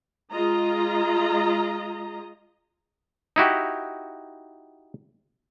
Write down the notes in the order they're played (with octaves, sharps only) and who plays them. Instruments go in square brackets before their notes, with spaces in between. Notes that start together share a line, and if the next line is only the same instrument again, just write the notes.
[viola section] G#3 F4 D#5 A#5
[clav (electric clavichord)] D#4 E4 F#4 G4